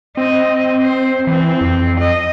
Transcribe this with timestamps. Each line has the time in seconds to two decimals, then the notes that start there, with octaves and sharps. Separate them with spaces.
0.17 C4 D#5
0.82 C5
1.27 E3 C4
1.61 F2
1.99 D#5